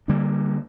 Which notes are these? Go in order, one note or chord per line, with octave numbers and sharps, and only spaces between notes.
D3 G3 A#3 D4